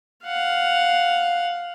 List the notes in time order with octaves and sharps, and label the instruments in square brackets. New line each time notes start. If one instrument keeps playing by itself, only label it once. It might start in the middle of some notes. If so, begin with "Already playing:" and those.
[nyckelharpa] F5 F#5